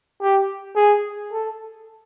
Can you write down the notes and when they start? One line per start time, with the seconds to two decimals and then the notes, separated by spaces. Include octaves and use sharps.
0.22 G4
0.76 G#4
1.32 A4